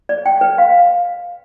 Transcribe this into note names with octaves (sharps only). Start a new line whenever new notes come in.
D5
G5
B4
F5